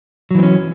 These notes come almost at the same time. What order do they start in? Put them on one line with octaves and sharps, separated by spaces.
F#3 E3 C4 C#4